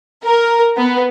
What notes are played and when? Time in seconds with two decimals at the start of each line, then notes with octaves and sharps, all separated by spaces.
0.24 A#4
0.77 B3